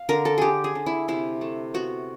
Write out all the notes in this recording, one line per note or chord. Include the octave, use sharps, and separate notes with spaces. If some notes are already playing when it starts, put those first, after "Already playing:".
Already playing: F5
D3 A#4
A4
D3 G4 G#4
G#4
D3
E4
C3 E4
A3
B3 F#4